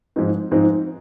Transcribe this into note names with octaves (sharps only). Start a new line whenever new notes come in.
G#2 F3 G#3 C4 D#4
G#2 F3 G#3 C4 D#4